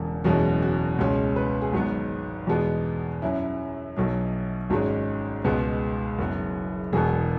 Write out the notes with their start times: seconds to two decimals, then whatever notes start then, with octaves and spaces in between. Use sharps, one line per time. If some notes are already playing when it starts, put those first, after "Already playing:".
Already playing: E1 E2 C#3
0.24 F#1 E2 B2 G#3 C#4 F#4
0.62 F#4
0.99 C#2 B2 G#3 C#4
1.36 B4
1.62 G#4
1.73 G#1 G#2 F#3 B3 F#4
2.47 E2 B2 G#3 B3
3.22 F#2 F#3 C#4 E4
3.96 B1 B2 F#3
4.70 G#1 G#2 G#3 C#4 F#4
5.44 C#2 B2 G#3 B3 B4
6.18 F#1 F#2 F#3 B3
6.93 E1 E2 B2 B3 G#4